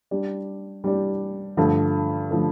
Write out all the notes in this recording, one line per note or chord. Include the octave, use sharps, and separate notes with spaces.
G3 D4 G4 D5
G3 D4 G4 D5
G2 D3 F3 A3
D3 F3 A3